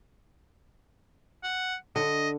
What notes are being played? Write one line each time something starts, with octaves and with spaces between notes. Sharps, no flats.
F#5
D3 D#5